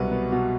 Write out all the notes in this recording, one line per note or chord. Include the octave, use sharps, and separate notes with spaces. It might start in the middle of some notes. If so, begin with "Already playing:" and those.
Already playing: C2 B2 F#3 B4
B3
B2